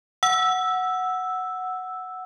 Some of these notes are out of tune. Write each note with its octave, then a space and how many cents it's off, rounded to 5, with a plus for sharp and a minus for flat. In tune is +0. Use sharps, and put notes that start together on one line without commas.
F#5 +0 E6 +0